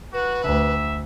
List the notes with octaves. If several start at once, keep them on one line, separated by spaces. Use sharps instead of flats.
F#4 B4
D2 E5